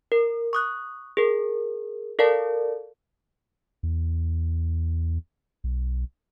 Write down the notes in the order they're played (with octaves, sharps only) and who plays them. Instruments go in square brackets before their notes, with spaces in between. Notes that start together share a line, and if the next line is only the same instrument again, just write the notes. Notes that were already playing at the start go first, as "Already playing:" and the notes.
[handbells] A#4
C#6 D#6 F#6
G#4 A#4
A4 A#4 D5 F5 A5
[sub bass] E2
B1